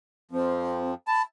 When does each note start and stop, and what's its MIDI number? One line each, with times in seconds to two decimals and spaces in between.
0.31 0.94 41
0.31 0.94 53
0.31 0.91 60
1.08 1.22 81
1.08 1.22 83